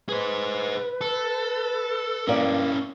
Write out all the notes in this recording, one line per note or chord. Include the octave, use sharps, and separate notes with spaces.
G#4 B4 C5
A4
G2 A#3 C#4 E4 D5